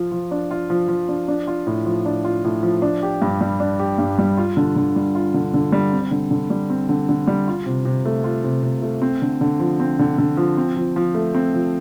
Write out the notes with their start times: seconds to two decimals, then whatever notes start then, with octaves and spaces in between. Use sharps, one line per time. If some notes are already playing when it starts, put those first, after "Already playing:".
Already playing: F3 F4
0.12 F3
0.31 D4
0.51 F4
0.70 F3
0.88 F3
1.08 D4
1.28 D4
1.47 F4
1.67 A2
1.86 F3
2.06 D4
2.25 F4
2.44 A2
2.63 F3
2.82 D4
3.03 G4
3.22 G2
3.41 G3
3.60 D4
3.79 G4
3.98 G2
4.19 G3
4.37 F4
4.57 D3
4.76 D3
4.96 G3
5.15 F4
5.34 D3
5.54 D3
5.72 G3
5.93 C4
6.11 D3
6.31 D3
6.50 G3
6.70 C4
6.89 D3
7.09 D3
7.27 G3
7.48 F4
7.66 C3
7.85 C3
8.05 A3
8.24 F4
8.44 C3
8.63 C3
8.82 A3
9.02 C4
9.22 D3
9.41 D3
9.60 F3
9.80 C4
9.99 D3
10.18 D3
10.37 F3
10.57 C4
10.76 F3
10.96 F3
11.15 A3
11.34 C4
11.54 F3